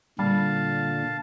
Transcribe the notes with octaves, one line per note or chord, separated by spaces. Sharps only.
A#2 D3 G3 F5 A5